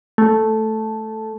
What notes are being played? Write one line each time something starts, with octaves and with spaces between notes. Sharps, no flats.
A3